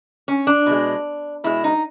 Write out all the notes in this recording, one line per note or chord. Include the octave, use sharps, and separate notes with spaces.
C#4
D4
B2 G#3
B2 G#3 E4
D#4